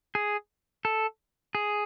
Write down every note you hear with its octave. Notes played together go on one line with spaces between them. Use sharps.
G#4
A4
G#4